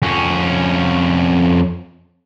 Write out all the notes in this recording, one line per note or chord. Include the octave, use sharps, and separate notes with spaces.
F2 C#4